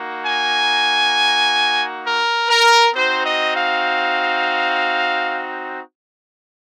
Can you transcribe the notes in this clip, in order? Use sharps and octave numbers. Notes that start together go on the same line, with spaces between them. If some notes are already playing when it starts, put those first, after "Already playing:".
Already playing: A#3 D#4 F#4
G#5
A#4
A#4
C4 D#4 F#4 C5
D#5
F5